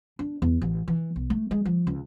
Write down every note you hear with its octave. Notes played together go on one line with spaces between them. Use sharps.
D4
E2
A1
E3
B1
A3
G#3
F3
C#2